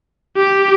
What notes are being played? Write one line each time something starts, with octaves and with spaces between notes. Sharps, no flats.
G4